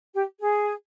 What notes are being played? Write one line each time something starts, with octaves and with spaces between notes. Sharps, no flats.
G4
G#4